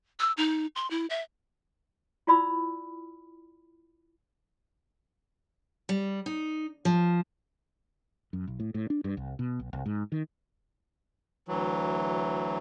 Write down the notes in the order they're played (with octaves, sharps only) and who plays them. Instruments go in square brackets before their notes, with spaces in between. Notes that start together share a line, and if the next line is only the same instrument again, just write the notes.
[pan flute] E6
D#4
C6
E4
E5
[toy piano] E4 F4 D5 B5 E6
[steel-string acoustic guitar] G3
D#4
F3
[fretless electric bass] F#2
B1
A2
A2
D4
G2
C2
B2
B1
C2
G#2
D#3
[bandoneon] D2 E3 F#3